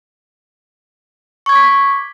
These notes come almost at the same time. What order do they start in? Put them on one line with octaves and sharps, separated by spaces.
C#6 G#6 D6 B6